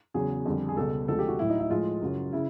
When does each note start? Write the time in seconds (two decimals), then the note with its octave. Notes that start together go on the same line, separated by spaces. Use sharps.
0.14 E2 C#3 F#3 G#4
0.45 F2 D3 G3
0.69 G#4
0.77 C#2 B2 G3 A4
1.08 D2 C3 F3 G#3 A4
1.19 G4
1.28 F#4
1.39 A2 F#3 E4
1.50 D#4
1.60 E4
1.70 A2 F3 G#3 F4
2.02 F#2 C#3 F#3
2.33 C#3 E4